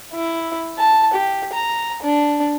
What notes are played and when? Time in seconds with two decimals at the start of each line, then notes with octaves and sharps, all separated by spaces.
0.14 E4
0.78 A5
1.14 G4
1.53 A#5
2.03 D4